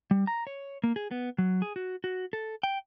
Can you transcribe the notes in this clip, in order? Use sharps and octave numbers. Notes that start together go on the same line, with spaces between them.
G3
A#5
C#5
A#3
G#4
B3
F#3
G#4
F#4
F#4
A4
G5